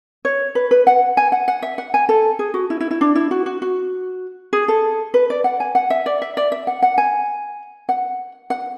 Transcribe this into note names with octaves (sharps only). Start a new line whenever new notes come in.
C#5
B4
B4
F#5
G#5
F#5
F#5
E5
F#5
G#5
A4
G#4
F#4
E4
E4
E4
D4
E4
F#4
F#4
F#4
G#4
A4
B4
D5
F#5
G#5
F#5
E5
D5
E5
D5
E5
F#5
F#5
G#5
F#5
F#5